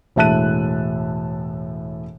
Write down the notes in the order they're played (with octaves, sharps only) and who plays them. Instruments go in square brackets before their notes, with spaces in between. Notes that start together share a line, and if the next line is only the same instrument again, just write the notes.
[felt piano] E1 A2 E5 A5 F#6 D#7